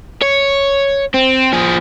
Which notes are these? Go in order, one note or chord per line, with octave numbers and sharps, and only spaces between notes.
C#5
C4
F3 G#4